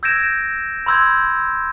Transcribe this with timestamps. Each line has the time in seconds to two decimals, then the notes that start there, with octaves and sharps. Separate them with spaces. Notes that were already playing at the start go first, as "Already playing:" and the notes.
0.03 E6 G6 G#6 A#6 D7 E7
0.86 B5 C6 E6 G6 G#6